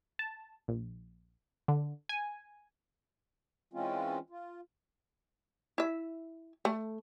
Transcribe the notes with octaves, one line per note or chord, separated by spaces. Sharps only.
A5
A#1
D3
G#5
E3 G#3 C4 C#4 F4
F4
E4 E5
A3